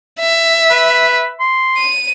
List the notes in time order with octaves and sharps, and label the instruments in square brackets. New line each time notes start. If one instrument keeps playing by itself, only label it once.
[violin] E5
[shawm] B4
C6
[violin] D#7